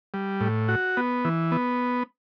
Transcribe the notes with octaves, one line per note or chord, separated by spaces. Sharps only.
G3
A2
F#4
B3
E3
B3